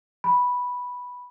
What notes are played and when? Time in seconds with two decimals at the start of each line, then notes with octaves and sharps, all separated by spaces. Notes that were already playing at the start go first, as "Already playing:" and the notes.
0.24 B5